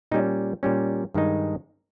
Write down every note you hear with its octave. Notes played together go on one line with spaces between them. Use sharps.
A#2 G3 C#4 D#4
A#2 G3 C#4
G2 D#3 G#3 D#4